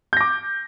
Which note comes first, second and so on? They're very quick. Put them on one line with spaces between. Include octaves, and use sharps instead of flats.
G6 A#6 D6